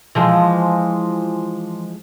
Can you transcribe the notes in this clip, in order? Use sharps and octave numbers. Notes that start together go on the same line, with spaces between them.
E3 F3 G#3